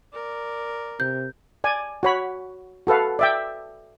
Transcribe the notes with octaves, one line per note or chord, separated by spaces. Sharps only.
A#4 D5
C3 G6
D5 G#5
F#4 C#5 B5
F#4 A4 B4 F5
D5 E5 G5